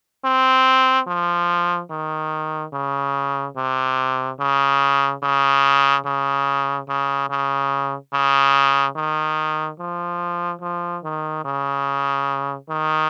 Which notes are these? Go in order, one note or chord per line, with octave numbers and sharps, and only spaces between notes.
C4
F3
D#3
C#3
C3
C#3
C#3
C#3
C#3
C#3
C#3
D#3
F3
F3
D#3
C#3
D#3